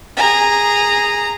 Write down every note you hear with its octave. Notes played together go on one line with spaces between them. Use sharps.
G#4 A#5